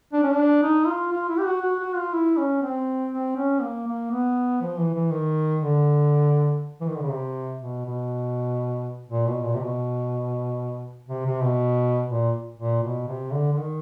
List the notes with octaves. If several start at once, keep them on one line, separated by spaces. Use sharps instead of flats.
D4
C#4
D4
D#4
F4
F4
E4
G4
F#4
F#4
F#4
F4
E4
C#4
C4
C4
C#4
A#3
A#3
B3
F3
E3
E3
D#3
D3
E3
D#3
D3
C#3
C3
B2
B2
A#2
B2
A#2
C3
B2
C3
C3
B2
A#2
A#2
B2
C3
D3
D3
D#3